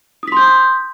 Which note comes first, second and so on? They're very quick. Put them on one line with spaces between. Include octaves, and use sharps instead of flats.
D#6 B6 C6 G6